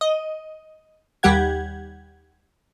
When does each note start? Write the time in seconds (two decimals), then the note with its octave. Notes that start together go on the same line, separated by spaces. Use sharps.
0.01 D#5
1.23 D#2 G3 G4 F#5 G#6